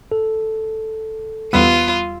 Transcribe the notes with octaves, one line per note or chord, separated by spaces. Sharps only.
A4
E2 G3 B3 F4 E6 D#7